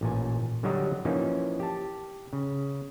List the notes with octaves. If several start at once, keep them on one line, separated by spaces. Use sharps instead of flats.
A1 A#2 G#5
D3 F#3 G3 F#4 D#5 A#5
E3 F3 A#3 C#4 D#4
G4 A5
C#3